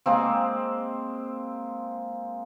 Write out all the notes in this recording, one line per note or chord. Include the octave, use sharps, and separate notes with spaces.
G#3 A#3 C4